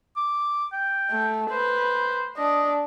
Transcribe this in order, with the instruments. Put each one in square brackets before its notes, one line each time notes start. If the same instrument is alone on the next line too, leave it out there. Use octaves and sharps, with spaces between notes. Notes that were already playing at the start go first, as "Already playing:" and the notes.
[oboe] D6
G5
[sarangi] A3
[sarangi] B4 [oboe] C5
[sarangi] D4 [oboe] D#5